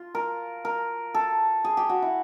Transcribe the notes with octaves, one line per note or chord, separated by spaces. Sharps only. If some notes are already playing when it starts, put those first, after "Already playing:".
Already playing: F4
A#4
A#4
A4
G#4
G4
F#4
E4